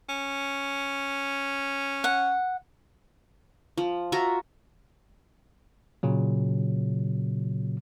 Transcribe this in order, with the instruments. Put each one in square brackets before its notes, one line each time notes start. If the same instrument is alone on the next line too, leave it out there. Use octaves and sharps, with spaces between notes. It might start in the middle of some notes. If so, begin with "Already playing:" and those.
[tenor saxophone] C#4
[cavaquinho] F#5
[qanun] F3
F4 F#4 E5 A#5
[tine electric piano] A#2 C#3 F#3